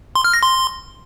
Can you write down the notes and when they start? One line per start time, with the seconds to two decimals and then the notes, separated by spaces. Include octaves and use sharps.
0.15 C6
0.24 F6
0.34 A#6
0.43 C6